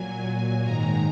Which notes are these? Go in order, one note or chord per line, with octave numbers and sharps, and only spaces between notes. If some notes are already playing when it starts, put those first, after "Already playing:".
Already playing: A#2 F#3 G#5
G#2 D#3 G#3 A#5